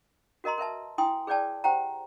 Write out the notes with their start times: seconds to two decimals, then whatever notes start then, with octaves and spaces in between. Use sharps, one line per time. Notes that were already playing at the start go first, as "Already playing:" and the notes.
0.44 F#4 A#4 D#5 A#5 C6
0.58 A#4 B4 E5 A5
0.98 E4 G5 G#5 C6 D#6
1.27 G#4 B4 C#5 D5 G5 A5
1.64 G4 C5 F#5 G5 A#5